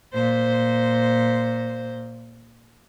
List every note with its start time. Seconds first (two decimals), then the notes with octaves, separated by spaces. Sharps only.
0.14 A#2 C5